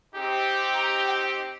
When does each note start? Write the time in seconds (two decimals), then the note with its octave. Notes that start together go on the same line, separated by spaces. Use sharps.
0.15 C4 D#4 G4
0.75 A#5
1.06 G5